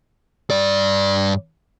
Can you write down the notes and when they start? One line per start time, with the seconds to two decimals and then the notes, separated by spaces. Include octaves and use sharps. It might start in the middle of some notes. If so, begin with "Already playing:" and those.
0.50 G2 D5